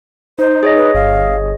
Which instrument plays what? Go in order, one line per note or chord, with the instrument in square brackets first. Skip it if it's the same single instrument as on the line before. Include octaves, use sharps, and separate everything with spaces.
[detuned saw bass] D#4 [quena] C5
[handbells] G#4 C#5 D#5
[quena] B4
[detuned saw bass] G1 [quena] F5